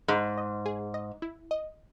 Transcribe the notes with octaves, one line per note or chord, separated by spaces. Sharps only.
G#2 G#4
D#5
G#4
D#5
E4
D#5